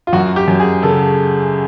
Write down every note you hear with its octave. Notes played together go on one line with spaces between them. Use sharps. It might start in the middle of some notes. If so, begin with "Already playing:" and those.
F4
F#2 F#4
G4
F#2
G#4
C#3 A4